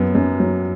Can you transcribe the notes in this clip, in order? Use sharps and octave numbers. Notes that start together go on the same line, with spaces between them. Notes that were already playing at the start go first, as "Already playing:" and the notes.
Already playing: F#2 F#3 B3
F#2
F#3